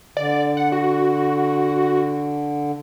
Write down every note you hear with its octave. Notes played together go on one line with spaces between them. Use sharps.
D3 D5
F#5
F#4